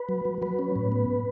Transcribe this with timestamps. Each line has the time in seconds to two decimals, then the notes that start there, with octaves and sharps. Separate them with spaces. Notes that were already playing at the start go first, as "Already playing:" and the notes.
Already playing: B4
0.09 F#3
0.25 F#3
0.42 F#3 B4
0.59 C#4
0.76 A2
0.92 B3